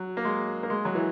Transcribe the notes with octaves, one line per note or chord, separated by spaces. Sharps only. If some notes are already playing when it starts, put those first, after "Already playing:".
Already playing: F#3
A#3
G#3
A#3
G#3
F#3
E3